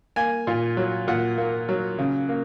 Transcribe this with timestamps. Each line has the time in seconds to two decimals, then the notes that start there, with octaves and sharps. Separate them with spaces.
0.16 A#3 G#5
0.47 A#2
0.77 F#3
1.08 A#2 F#5
1.38 A#3
1.69 F#3
1.99 C#3
2.29 A#3